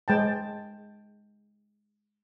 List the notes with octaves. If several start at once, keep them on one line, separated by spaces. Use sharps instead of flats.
G#3 G5 A5